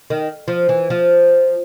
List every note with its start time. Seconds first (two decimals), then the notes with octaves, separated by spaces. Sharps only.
0.10 D#3
0.48 F3
0.69 E3
0.90 F3